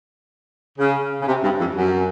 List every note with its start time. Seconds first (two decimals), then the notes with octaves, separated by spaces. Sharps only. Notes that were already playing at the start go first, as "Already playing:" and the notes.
0.79 C#3
1.21 C#3
1.28 C3
1.43 G2
1.60 F2
1.76 F#2